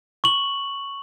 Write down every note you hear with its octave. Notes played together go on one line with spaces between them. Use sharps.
C#6 F#7